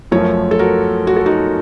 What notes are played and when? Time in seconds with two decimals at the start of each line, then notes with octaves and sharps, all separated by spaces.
0.11 F#2 F3 A3 A#4 C#5
0.51 A4
0.59 F#4 A#4
1.07 F#4
1.16 A4
1.26 D#4 F#4